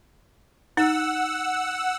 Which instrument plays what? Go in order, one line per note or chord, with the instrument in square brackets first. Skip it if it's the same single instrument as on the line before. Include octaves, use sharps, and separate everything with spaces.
[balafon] D#4 [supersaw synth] F#5 E6